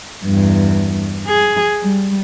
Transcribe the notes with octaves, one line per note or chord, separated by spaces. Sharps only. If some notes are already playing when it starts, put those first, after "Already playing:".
E2 G2
G#4
G3